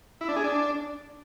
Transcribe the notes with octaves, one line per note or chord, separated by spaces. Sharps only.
E4
D4
G#4
D4